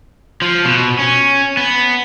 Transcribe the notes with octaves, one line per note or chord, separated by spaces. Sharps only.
F3
B2
C#4
B3